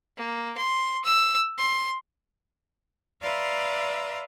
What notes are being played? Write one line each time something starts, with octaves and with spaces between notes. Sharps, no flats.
A#3
C6
E6
C6
B4 D5 E5 F5 A#5 C6